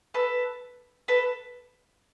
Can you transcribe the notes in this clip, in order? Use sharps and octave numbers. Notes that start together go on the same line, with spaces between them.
A4 B4
A4 B4